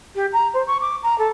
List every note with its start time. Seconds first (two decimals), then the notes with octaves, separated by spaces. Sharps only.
0.15 G4
0.33 A#5
0.54 C5
0.67 C#6
0.81 D6
1.03 A#5
1.18 A4